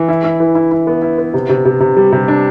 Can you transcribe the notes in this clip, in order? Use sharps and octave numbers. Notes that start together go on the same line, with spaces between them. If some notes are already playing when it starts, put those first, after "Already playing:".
Already playing: E3
E4
E4
E3
E4
E4
B3
E4
B3
C3
C3
C3
C3
G3
C3
D4